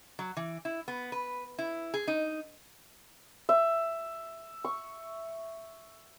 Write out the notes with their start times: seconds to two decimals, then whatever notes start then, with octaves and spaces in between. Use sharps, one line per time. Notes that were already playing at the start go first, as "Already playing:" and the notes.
0.19 F#3
0.37 E3
0.65 E4
0.88 B3
1.12 B4
1.58 E4
1.94 G#4
2.07 D#4
3.49 E5
4.65 C#6